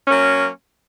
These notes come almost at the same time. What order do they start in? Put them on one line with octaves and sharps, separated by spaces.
C#4 A#3 F#3